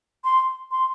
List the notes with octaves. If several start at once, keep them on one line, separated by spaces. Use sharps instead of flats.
C6
C6